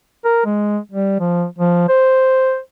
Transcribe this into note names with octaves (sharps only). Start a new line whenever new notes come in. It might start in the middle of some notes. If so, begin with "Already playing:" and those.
A#4
G#3
G3
F3
F3
C5